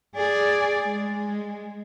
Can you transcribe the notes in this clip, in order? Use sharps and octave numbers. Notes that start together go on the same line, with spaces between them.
G#4 D5
G#3